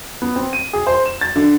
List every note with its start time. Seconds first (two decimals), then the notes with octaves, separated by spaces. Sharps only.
0.22 B3
0.36 C4
0.53 D#7
0.73 G#4
0.87 C5
1.06 E7
1.21 A6
1.36 D3